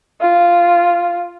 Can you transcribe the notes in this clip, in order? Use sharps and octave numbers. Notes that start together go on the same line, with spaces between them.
F4